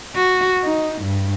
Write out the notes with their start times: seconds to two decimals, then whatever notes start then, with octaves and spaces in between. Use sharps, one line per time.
0.16 F#4
0.64 D#4
1.02 G2